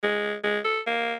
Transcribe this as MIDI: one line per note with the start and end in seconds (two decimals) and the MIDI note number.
0.03 0.35 56
0.44 0.59 56
0.65 0.80 69
0.87 1.15 58